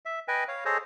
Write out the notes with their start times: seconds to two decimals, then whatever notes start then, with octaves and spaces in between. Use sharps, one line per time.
0.05 E5
0.28 B4 D#5 G5 G#5
0.48 C#5 F5
0.65 G#4 A4 C5 C#5 D#5